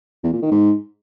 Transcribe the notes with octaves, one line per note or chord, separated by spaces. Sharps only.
E2
A#2
D#3
G#2